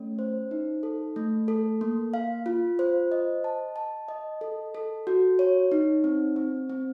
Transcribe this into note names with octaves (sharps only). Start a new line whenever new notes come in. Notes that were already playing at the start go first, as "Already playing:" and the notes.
Already playing: A3 C#4
C5
D#4
A4
A3
A4
A#3
F5
F4
C5
D#5
A5
A5
D#5
A4
A4
F#4
C#5
D#4
C4
C4
C4